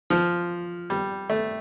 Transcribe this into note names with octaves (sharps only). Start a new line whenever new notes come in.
F3
G3
A3